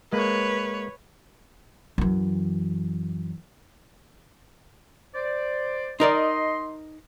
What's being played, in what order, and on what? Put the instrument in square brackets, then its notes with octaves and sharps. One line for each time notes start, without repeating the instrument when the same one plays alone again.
[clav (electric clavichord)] G#3 A#3 [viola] B4 C#5
[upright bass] F#2 E3
[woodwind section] C5 D5
[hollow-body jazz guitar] D#4 A#4 D5 [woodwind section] D#5 C6